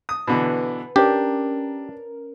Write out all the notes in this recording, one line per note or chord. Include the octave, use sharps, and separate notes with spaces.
D#6
B2 D3 E3 B4
C#4 D4 G4 A#4